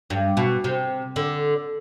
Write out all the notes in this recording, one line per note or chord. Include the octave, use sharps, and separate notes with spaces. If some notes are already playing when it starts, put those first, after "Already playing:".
G2
B2
C3
D3